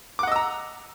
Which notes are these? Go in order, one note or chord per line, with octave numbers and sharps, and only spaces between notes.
D#5 F#5 A#5 D6 E6